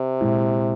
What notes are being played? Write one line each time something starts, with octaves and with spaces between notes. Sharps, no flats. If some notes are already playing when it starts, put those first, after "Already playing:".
Already playing: C3
A#2 G#3 E4